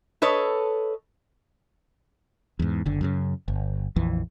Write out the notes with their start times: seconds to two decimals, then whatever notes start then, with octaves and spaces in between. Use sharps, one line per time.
0.22 A4 B4 C#5 D#5
2.59 E2 G#2
2.86 F#1 D3
3.01 F#2 A#2 C#3
3.48 G1
3.96 A#1 F2 E3